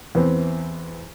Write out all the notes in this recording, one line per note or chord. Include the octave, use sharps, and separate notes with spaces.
E2 B3 C4